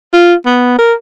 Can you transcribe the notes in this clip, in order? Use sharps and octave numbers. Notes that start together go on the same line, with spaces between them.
F4
B3
A#4